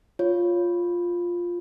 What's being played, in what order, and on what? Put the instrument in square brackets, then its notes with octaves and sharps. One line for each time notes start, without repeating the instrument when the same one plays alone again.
[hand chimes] F4 C#5